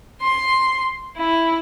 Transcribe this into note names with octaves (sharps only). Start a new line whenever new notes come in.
C6
E4